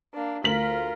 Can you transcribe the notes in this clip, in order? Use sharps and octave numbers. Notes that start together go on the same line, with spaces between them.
A#3 D4
D2 F4 A#4 B6 F#7